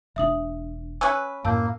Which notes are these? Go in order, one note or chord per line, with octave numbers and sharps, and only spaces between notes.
E1 D4 E5 D#6 F#7
C#4 B4 E6 F#6
F#2 A2 A#3 A5 E6 G6